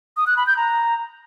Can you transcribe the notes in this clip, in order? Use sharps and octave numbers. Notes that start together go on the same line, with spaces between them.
D#6
F#6
B5
G6
A#5